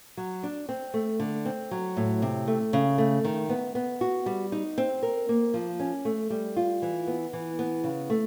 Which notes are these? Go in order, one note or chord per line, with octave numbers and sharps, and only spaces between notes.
F#3
D4
C4
A3
D3
C4
F#3
A2
C3
A3
C#3
A3
D#3
B3
B3
F#4
G3
D#4
C4
A#4
A#3
F3
C#4
A3
G3
F4
E3
B3
E3
B3
C#3
A3